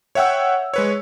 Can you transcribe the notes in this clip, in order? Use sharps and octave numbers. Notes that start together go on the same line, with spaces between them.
C#5 E5 F#5 G5 E6
G#3 B4 C#5